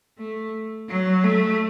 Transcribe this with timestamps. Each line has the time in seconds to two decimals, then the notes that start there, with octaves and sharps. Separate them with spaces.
0.18 A3
0.88 F#3
1.23 A3